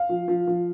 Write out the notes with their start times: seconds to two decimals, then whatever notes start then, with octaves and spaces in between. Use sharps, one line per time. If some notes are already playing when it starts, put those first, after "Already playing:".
Already playing: F5
0.09 F3
0.28 F3
0.47 F3